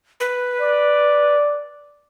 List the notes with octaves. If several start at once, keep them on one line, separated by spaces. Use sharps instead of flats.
B4
D5